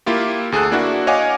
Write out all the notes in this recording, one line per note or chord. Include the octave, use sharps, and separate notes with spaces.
A#3 E4 F4 G4
D2 G#4 A4 F#6
A#3 D4 E4 F#4
C#5 D#5 F5 F#5 G#5 D6